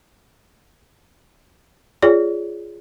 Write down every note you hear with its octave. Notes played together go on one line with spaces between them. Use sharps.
F4 G#4 C#5 D5